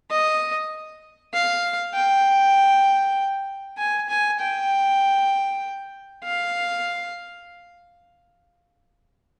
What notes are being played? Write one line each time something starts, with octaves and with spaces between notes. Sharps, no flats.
D#5
F5
G5
G#5
G#5
G5
F5